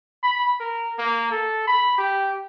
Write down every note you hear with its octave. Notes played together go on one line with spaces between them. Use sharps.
B5
A#4
A#3
A4
B5
G4